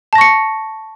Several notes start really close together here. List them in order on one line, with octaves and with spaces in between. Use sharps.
A5 A#6 C#6 C#7